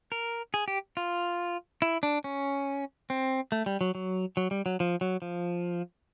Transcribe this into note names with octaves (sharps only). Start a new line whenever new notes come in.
A#4
G#4
G4
F4
E4
D4
C#4
C4
A3
G3
F#3
F#3
F#3
G3
F#3
F3
F#3
F3